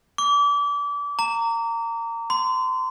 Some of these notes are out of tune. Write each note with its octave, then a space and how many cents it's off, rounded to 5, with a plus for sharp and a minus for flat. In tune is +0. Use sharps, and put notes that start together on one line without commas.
D6 -30
A#5 -20
C6 -30